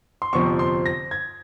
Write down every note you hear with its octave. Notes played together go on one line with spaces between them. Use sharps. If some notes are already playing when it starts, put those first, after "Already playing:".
C6
G1 F2 C3 F3 C4 C#6
C6
A#6
G#6